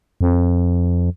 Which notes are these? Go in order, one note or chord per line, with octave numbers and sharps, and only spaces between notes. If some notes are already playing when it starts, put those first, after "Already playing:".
F2